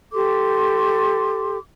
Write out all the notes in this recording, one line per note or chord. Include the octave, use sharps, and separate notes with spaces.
G4 A4 C6 D6